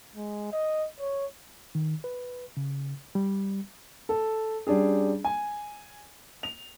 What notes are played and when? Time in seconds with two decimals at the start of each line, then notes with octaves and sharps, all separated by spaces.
0.16 G#3
0.52 D#5
1.00 C#5
1.75 D#3
2.04 B4
2.57 C#3
3.15 G3
4.09 A4
4.67 G3 C#4 D4 G#4
5.25 G#5
6.43 F7